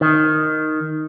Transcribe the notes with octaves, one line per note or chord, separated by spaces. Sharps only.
D#3